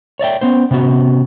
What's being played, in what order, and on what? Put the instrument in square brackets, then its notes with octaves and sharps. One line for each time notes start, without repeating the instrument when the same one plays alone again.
[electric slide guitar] C#5 D5 E5 G5
B3 C#4 C5
C3 B3 C#4 F#4